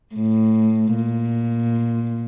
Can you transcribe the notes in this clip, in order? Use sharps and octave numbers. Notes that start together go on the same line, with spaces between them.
A2
A#2